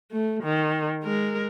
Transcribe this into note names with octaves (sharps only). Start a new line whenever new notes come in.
A3
D#3
G#3 A#4